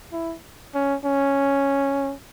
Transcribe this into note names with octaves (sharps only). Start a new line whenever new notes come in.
E4
C#4
C#4